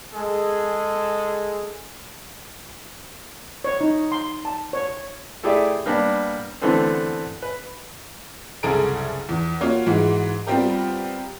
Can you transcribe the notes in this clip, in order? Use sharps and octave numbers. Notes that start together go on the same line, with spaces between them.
G#3 G#4 A4
C#5
D#4
C6
A5
C#5
A3 E4 G4 G#4 D5 E5
G3 A#3 B3 D4
D3 E3 A3 B3 C4
B4
F#1 C2 G#4 A4 A#5 D7
E2
A#3 F4 F#4 C#5
G#2 E3 G#3 F#4
G3 B3 C4 F4 G4 A#4